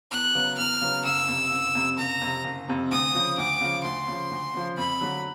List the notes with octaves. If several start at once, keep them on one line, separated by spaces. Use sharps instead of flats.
E2 F#6
C#3 F#3 B3
E2 F6
C#3 F#3 B3
F#1 E6
F2 C3
F#1
F2 C3
F#1 A#5
F2 C3
F#1
F2 C3
D2 D#6
C#3 F3
D2 D6
C#3 F3
D2 C6
C#3 F3
D2
C#3 F3
F2 B5
D3 F#3